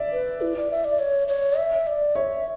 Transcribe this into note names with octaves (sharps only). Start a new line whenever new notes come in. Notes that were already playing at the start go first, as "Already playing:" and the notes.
Already playing: D5 E5
B4
E4
D5
E5
D5
C#5
C#5
E5
D5
C#5 E5